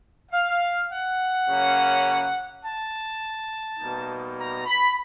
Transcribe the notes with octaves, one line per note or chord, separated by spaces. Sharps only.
F5
F#5
C#3 F#3 A#3 C#4
A5
B2 G3 A#3 D#4
A#5
B5